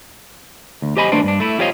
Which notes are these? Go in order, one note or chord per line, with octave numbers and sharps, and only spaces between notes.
D2
G4 C5 D#5 G#5 B5
D#2 A3 D4 B4 C5 D5
G2 D4
A3 E4
F4 G4 C5 C#5 D#5 F5